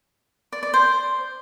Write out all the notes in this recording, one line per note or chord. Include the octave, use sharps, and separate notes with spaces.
D5
D5
C5